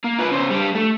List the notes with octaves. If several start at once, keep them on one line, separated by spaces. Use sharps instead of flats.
A#3
F4 B4
C#3 C5
G3 D4
A3